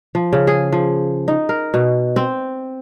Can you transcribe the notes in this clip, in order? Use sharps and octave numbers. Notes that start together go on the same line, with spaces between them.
F3
C#3
G#4
F3
D#4
A#4
B2
C4